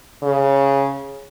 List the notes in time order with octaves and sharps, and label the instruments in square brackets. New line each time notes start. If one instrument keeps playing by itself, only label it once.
[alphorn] C#3